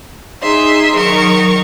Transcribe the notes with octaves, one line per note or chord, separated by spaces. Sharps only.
D#4 G#4 E5 C6
D#3 F#3 A#4 C#6